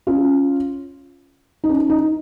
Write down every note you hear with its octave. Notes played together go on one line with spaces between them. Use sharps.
C#4 F4
D#4
C#4
D#4